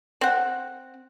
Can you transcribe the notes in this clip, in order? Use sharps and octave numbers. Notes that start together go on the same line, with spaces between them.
C4 F#5